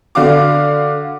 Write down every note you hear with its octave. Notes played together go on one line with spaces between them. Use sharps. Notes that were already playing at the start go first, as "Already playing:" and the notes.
D3 F#4 F5 D6